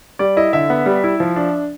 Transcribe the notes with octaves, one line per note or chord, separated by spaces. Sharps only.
G3 D5
E4 D#5
D3 E5
B3
G3
E4
F3
D4